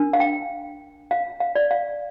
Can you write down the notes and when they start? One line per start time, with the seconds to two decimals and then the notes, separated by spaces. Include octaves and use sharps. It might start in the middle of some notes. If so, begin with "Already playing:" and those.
Already playing: D4 A#4
0.13 F5
0.20 G5
1.11 F5
1.40 F5
1.55 D5
1.71 F5